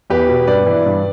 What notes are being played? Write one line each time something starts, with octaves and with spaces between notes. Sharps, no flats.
E2 G4 B4
B2
G2 B4 D5
E3
G2